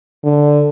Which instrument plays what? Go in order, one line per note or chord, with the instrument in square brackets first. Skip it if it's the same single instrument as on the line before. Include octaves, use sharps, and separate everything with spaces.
[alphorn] D3